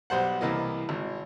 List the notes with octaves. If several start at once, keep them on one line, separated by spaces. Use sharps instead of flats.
B1 G3 C5 F#5
C2 E3 A#3 E4 D#5
G#1